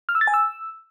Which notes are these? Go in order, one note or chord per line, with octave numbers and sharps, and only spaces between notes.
F6
E6
A6
G#5
E6